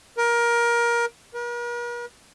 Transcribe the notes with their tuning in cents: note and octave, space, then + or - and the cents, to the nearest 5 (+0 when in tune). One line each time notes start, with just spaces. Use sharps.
A#4 +20
A#4 +45